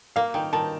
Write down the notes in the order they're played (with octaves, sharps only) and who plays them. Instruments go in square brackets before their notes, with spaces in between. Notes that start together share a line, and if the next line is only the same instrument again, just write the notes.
[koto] A#3 [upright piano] F5
[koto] D#3 [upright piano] G5
[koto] D#3 [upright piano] A5